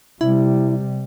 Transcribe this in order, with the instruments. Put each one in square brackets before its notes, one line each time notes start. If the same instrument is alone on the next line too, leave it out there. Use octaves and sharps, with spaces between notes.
[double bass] C3 G3 [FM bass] E4